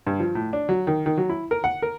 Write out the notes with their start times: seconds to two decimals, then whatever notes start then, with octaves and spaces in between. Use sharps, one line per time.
0.07 G2
0.20 F3
0.35 A2
0.53 D4
0.69 F#3
0.87 D#3
1.06 D#3
1.17 F#3
1.29 E4
1.51 A#4
1.64 F#5
1.82 A#4